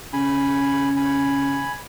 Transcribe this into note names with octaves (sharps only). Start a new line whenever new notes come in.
C#3 G#5 B5
G#5 B5